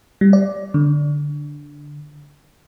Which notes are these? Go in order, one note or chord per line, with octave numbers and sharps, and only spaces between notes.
G3
D5
D3